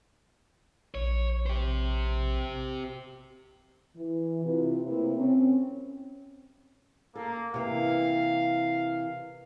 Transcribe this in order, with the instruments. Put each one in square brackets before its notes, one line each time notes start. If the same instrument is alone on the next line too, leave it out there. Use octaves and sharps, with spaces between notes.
[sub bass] A#1 [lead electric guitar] C#5
[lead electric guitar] G4 C5
[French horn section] E3
C3 E4 F4 B4
C3 A3 A#3 E4 C5
C4 C#4
[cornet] A#3 [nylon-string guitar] A4
[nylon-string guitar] C3 E3 A#3 [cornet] F5